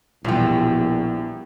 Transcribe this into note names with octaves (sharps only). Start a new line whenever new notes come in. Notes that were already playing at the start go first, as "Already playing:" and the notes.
A#1 E2 B2 G3 B3 E4 F4 G5